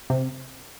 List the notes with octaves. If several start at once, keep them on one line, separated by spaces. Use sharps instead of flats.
C3